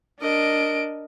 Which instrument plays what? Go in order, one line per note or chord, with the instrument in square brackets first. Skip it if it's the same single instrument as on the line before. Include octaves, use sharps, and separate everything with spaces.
[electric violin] D4 D7 [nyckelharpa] A#4 D#5